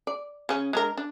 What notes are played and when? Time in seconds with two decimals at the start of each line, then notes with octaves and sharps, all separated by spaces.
0.07 D5
0.49 C#3 C#4
0.73 G#3 D4 A#4
0.97 D4